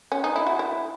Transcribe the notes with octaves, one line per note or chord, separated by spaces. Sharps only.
C#4
D#4
E4
F#4
E4